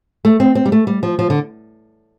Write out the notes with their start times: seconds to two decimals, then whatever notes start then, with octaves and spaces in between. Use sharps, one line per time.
0.25 A3
0.40 C4
0.55 C4
0.65 G3
0.72 A3
0.87 G3
1.03 F3
1.19 F3
1.30 D3